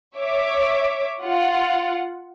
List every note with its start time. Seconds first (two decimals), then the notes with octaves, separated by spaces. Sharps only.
0.16 C#5 E5 D6
1.24 F4 F#5